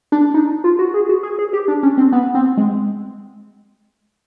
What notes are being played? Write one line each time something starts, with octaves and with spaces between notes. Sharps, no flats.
D4
D#4
F4
F#4
G#4
F#4
G#4
G#4
G4
D4
C#4
C4
B3
C4
G#3